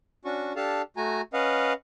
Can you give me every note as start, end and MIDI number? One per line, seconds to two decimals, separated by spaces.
0.25 0.53 61
0.25 0.53 62
0.25 0.53 66
0.25 0.53 85
0.56 0.82 62
0.56 0.82 67
0.56 0.82 69
0.56 0.82 77
0.56 0.82 81
0.97 1.21 57
0.97 1.21 66
0.97 1.21 80
0.97 1.21 82
1.33 1.73 61
1.33 1.73 71
1.33 1.73 75
1.33 1.73 77
1.33 1.73 78